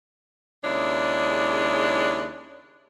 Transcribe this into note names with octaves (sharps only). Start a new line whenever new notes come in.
D#2 C#3 G#3 D4 E4 C#5